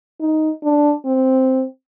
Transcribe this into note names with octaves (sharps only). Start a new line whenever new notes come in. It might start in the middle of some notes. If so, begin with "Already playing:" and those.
D#4
D4
C4